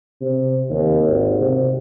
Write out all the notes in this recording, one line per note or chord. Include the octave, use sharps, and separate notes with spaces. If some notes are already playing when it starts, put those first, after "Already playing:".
C3
D#2
G#1
C3